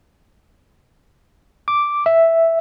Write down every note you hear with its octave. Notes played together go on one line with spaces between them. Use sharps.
D6
E5